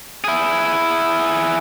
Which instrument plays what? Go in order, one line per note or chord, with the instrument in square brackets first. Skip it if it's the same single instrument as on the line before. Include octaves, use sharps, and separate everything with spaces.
[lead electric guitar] E4 G#4